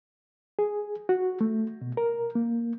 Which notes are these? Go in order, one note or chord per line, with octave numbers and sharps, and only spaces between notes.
G#4
F#4
A3
B2
A#4
A#3